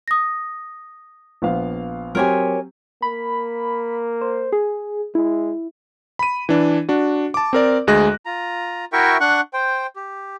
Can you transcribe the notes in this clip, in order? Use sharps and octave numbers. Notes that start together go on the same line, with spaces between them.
D#6 A#6
A#1 B3 F5
F#3 C4 G4 A#4 C#5 G#5
A#3 B5
C5
G#4
G#3 E4
B5 D#7
E3 D4
D4 F#4
A5 D6
C4 A#4 D5
D2 G#3 G#4 D#5 F#6 A#6
F4 A#5
E4 F#4 A#4 E5 G5 C#6
D4 F#5 C#6 F#6
C5 G5
G4